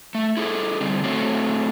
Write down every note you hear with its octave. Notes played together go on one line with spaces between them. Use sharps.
A3
E4 G#4 A4
D3 G3 C4
A3 C4 F#4 A4 C#5